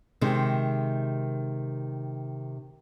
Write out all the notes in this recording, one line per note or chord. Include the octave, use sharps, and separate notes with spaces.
C3 D#3 G#3